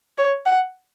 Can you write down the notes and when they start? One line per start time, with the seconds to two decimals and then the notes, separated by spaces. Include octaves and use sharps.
0.18 C#5
0.45 F#5